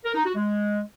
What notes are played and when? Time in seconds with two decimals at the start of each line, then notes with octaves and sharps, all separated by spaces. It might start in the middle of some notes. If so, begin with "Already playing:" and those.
0.04 A#4
0.14 D#4
0.25 F#4
0.35 G#3